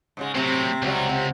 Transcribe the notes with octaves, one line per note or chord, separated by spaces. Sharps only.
G#2 C#3 G#3
A2 C3 F#3 C4
C#2 C3 F#3 G3
C3